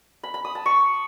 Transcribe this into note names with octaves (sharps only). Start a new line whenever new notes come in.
B5
B5
D#6
A5
C#6